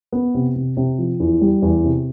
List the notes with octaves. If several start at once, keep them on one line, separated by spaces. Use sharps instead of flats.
B3
C3
C3
C3
F3
E2
G3
E2
C3